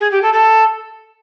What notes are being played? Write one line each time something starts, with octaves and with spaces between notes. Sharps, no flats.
G#4
G4
A4
A4